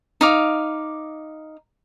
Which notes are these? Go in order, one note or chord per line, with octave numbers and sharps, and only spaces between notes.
D#4 F5 D6